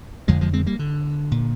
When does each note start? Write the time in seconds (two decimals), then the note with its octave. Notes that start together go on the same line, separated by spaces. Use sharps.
0.28 F1 F2 D3 F3 G#3
0.41 F3 G#3
0.53 G#3 C4
0.66 G3 A#3
0.79 D3
1.31 A#2